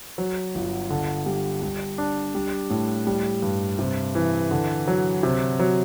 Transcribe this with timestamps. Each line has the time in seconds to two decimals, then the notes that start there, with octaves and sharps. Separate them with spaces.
0.18 F#3
0.55 G1
0.90 D3
1.26 G3
1.62 G3
1.98 D4
2.35 G3
2.70 A2
3.07 G3
3.42 G2
3.79 C3
4.15 E3
4.51 D3
4.87 F#3
5.23 C3
5.60 F#3